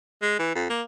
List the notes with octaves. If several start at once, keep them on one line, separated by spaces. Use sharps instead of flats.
G#3
E3
F2
A#3